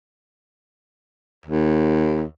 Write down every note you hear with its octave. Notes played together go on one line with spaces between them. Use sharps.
D#2